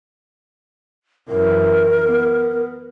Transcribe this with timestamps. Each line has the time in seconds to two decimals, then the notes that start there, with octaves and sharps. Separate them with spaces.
1.28 F#2 E3 A#4
2.06 B3